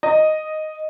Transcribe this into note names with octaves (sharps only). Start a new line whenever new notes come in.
D#5